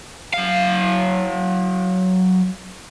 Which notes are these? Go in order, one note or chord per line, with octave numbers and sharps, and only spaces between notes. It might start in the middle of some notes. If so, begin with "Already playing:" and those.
F#3 F5